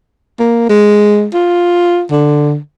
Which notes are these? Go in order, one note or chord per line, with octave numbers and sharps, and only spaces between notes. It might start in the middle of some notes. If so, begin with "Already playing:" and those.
A#3
G#3
F4
D3